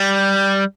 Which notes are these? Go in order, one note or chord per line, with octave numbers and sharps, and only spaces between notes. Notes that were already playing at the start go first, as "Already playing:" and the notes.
Already playing: G3